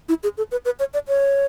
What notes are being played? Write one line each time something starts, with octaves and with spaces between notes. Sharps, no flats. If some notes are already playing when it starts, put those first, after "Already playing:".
E4
G#4
A4
B4
B4
C#5
D5
C#5